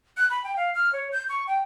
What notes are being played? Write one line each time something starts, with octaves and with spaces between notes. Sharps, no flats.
F#6
B5
G5
F5
F6
C#5
G6
C#6
G5